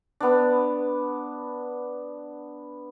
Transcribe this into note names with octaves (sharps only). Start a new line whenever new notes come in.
B3 D4